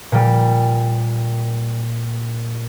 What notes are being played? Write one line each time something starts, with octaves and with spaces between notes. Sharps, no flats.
A#2 G3